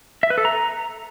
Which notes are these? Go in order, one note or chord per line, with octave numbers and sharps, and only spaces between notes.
E5
B4
A4
A#5